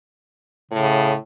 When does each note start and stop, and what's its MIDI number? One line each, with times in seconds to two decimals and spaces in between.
0.72 1.17 45
0.72 1.14 49